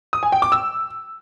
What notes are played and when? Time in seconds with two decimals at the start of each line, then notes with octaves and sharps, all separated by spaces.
0.13 D#6
0.23 G#5
0.32 G5
0.42 D6
0.52 E6